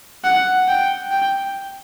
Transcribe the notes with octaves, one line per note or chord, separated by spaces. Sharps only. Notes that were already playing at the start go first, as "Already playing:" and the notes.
F#5
G5
G5